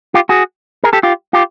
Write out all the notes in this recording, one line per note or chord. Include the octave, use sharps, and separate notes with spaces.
F4 G4
F#4 G#4
G#4 A#4
G4 A4
F4 G4
F4 G4